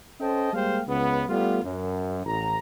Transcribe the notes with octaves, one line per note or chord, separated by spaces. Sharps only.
C#4 A4 C5 D#5 G5 A5
G3 G#3 A#3 C5 F5 G5
C#2 B3
G3 A3 B3 F4
F#2
A1 A#5